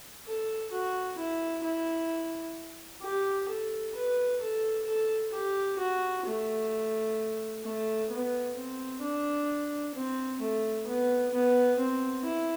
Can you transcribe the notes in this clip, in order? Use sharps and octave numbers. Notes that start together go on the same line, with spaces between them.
A4
F#4
E4
E4
G4
A4
B4
A4
A4
G4
F#4
A3
A3
B3
C4
D4
C4
A3
B3
B3
C4
E4